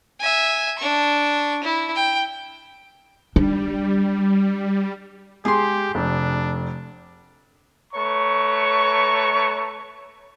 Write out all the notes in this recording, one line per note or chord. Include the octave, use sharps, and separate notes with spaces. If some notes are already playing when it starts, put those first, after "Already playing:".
E5 G#5
D4 C#6
E4
G5
G3 D4
G#3 G4 G#4 C6
F1 D4
A3 B4 C#5 A#5 C#6